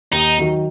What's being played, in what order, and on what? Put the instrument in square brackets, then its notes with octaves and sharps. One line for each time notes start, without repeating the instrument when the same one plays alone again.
[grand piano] D#2 [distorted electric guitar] D#4
[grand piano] D#3 F#3